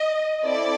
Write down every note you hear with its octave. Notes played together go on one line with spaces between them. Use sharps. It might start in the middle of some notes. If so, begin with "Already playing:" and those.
Already playing: D#5
C4 E4 A4 D5